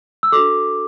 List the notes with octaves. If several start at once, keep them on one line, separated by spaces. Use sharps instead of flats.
E6
D4 F#4 A4 D6